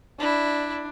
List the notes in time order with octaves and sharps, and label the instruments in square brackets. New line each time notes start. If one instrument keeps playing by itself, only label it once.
[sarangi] D4 [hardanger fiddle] E4